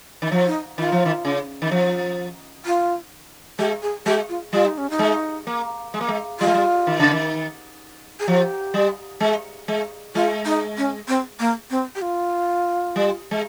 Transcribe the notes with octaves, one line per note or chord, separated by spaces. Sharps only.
D#3
F3
D#4
D#3 F4
F3
D#3
C#3
D#3
F3
F4
G#3 G4
G#4
G#3 G4
F4
G3 F4
D#4
C#4
D#4
G#3
A#3
G#3
A#3
G#3
G3 F4
G#3
G3
D#3
C#3
D#3
G#4
F3 G4
G3
G#3
G#3
G#3 F4
D#4
C#4
C4
A#3
C4
G4
F4
G3
G#3